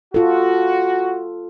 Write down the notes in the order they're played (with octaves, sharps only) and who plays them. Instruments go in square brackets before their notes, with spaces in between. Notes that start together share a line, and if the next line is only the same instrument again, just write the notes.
[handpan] F4 A4 [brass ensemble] F#4